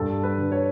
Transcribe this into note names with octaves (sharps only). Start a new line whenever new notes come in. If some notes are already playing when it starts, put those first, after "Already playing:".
Already playing: G2 A4
B4
D3
C#5